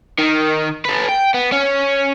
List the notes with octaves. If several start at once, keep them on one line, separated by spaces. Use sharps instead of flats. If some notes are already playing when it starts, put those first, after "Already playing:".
D#3
A4 B4
G5
B3
C#4